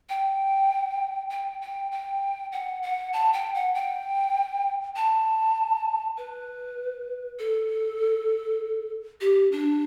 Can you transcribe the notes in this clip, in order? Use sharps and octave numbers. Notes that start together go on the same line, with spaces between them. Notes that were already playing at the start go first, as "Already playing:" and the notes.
G5
G5
G5
G5
F#5
F#5
A5
G5
F#5
G5
A5
B4
A4
G4
D4